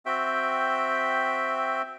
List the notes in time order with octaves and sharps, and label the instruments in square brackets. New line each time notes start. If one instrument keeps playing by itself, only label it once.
[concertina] C4 F#4 E5 G5